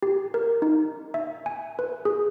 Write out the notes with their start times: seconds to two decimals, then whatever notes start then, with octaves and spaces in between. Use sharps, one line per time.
0.03 G4
0.34 A#4
0.62 D#4
1.14 E5
1.46 G#5
1.79 B4
2.05 G#4